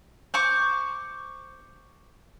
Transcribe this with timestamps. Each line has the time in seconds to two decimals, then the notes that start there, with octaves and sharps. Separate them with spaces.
0.34 C5 C#6 D6